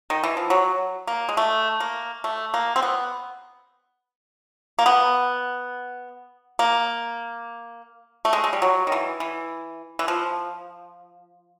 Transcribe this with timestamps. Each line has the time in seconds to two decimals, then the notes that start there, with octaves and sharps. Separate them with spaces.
0.10 D#3
0.24 E3
0.37 F3
0.50 F#3
1.07 A#3
1.29 G#3
1.37 A3
1.80 A#3
2.24 A3
2.54 A#3
2.76 C4
2.82 B3
4.79 A#3
4.86 B3
6.59 A#3
8.25 A3
8.33 G#3
8.44 G#3
8.53 G3
8.62 F#3
8.87 D#3
8.92 E3
9.20 E3
9.99 E3
10.08 F3